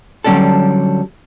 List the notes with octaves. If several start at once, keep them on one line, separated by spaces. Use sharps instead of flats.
D3 F#3 G3 C#4 D4 A4